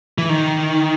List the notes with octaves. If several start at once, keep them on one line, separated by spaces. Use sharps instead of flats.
E3
D#3